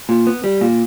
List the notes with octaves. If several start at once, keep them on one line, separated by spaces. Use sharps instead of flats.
A#2
B3
G3
A#2